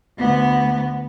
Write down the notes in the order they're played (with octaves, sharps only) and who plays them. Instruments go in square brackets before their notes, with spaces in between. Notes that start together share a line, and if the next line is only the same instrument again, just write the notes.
[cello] D2 B3